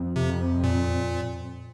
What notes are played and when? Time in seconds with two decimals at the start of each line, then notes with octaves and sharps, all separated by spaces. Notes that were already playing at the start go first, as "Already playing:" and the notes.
Already playing: F2
0.16 C3
0.63 A#2